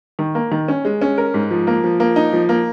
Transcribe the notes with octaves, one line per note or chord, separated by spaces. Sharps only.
D#3
A#3
D#3
C#4
G#3
C#4
A#4
G#2
F3
A#3
F3
A#3
D#4
F3
A#3